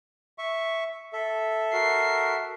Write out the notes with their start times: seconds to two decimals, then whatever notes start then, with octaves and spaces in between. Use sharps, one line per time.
0.38 E5 C#6
1.13 A4 E5
1.73 F#4 A#4 C7